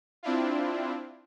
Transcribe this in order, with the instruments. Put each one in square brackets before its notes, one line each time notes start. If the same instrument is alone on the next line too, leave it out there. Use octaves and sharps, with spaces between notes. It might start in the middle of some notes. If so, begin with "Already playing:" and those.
[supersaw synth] C4 D4 E4 F4